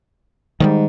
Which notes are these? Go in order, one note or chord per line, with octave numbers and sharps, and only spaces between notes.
G#2 D#3 F#3 G3